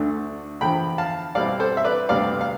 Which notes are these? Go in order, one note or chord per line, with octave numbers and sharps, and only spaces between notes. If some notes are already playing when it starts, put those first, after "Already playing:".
Already playing: D2 D3 A3 D4
E2 D3 F3 G5 B5
F5 A5
B2 G3 C4 E4 D5 F5
A4 C5
E5
B4 D5
D2 C3 G3 B3 D5 F5
F5